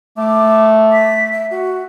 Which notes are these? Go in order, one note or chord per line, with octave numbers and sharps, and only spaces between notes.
A3 D6
B6
E5
F#4